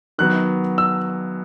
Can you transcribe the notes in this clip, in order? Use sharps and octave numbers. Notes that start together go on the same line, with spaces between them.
D#3 F#3 B3 F#6
E6